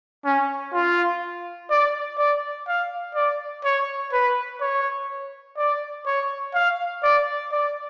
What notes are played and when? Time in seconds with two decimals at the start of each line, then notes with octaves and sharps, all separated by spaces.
0.25 C#4
0.73 F4
1.70 D5
2.18 D5
2.68 F5
3.15 D5
3.64 C#5
4.13 B4
4.61 C#5
5.57 D5
6.06 C#5
6.54 F5
7.03 D5
7.52 D5